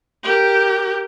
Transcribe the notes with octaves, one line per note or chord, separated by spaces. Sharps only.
G4 A#4